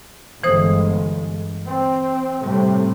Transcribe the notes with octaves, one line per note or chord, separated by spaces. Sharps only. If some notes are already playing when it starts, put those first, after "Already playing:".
G1 E3 G#3 C5 D#6
C4
A2 C3 G3